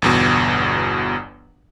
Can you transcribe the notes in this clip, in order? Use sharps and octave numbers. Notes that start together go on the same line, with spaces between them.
G1 E2 B2